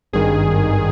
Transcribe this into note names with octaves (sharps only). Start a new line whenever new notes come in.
G#1 G2 D#3 G#4